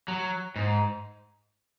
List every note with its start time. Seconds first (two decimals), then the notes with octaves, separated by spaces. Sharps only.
0.08 F#3
0.56 G#2